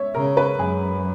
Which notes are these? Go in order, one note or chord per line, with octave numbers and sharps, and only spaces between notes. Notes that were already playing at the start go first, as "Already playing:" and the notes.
Already playing: C#5 E5
C#3 A#4
B4
F#2 G#4